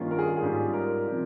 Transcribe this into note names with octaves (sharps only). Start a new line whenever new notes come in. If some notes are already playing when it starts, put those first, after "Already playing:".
Already playing: G2 D#3 A#3 C#4 F4
A#4
G#4
G#4
G#2 G3 C#4 F4
A#4
C3 F3